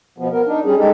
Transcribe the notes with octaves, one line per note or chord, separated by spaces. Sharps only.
B2 F3 B3
B3 A#4
D4 D#4
G3 C#4 G#4
G#3 D#4 G4 A4